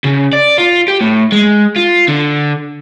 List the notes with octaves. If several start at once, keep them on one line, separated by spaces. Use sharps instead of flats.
C#3
D5
F4
G4
A2
G#3
F4
D3